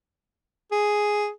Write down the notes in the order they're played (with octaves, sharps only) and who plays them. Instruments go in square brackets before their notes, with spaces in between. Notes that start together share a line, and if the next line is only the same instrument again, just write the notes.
[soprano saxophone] G#4